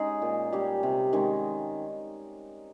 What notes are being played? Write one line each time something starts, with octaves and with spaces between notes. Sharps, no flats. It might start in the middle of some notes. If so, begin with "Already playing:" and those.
Already playing: G#3 C#4 D#4 G#4
A#2
G3 C#4 G4
C3
D#3 G#3 C#4